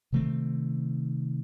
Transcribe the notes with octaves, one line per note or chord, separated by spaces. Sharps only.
C3 D#3 A3 C4